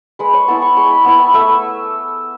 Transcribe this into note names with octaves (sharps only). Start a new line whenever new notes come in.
G#3 B4
C#5
B3 E4 A5
C#6
G#3 C#6
B5
B3 E4 A5
G#5
A3 E5